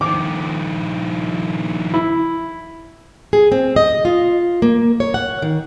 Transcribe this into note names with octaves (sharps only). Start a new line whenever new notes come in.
D#3 F3 D6
E4
G#4
C4
D#5
F4
A#3
C#5
F#5
D#3